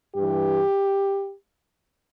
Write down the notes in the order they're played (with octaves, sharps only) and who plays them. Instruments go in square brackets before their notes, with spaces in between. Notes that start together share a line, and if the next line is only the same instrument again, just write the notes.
[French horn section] G2 E3 G4